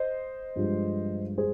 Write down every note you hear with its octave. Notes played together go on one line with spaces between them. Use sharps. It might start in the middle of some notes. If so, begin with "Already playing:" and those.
Already playing: C5 D#5
G2 F3 G#3
G#4 C5